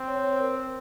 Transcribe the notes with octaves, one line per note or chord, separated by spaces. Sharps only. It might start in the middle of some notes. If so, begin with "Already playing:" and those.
Already playing: C4
C#5
C5
C#5
C5
A#4
C5